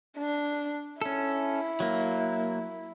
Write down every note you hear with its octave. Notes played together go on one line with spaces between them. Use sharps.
D4
C#4 E4 A4
F#3 A#3